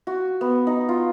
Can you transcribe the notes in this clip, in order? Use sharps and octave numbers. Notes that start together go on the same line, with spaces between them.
F#4
B3
D#4
F4